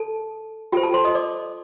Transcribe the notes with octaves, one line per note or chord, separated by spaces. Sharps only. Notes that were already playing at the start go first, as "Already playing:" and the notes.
Already playing: A4 A5
F4 G4 A4 C5 G5
A4 A5
C5 C6
D#5 D#6
D5 D6